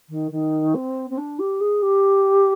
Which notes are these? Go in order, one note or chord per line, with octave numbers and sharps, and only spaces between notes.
D#3
D#3
C4
C4
D4
G4
G#4
G4